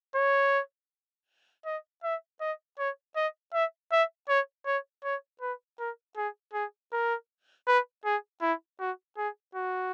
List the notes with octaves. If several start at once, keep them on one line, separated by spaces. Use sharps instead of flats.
C#5
D#5
E5
D#5
C#5
D#5
E5
E5
C#5
C#5
C#5
B4
A#4
G#4
G#4
A#4
B4
G#4
E4
F#4
G#4
F#4